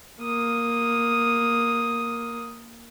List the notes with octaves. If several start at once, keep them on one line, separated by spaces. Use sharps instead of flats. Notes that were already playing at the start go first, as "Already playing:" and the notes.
A#3 D#6